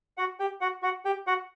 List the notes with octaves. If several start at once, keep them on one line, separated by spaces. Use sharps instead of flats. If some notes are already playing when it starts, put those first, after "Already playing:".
F#4 F#5
G4 G5
F#4 F#5
F#4 F#5
G4 G5
F#4 F#5